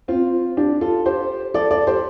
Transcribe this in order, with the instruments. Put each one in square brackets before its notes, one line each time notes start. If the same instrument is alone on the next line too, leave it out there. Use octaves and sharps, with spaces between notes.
[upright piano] C4 F4
D4 G4
F4 A4
G4 C5
A4 D5
A4 D5
G4 C5